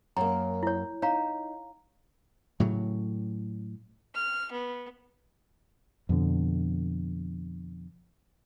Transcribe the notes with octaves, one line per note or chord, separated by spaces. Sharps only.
F#2 A#3 A#5
E4 C#5
D#4 C#5 F5 A#5
A2 C#3 F#3
F6
B3
F2 B2 D3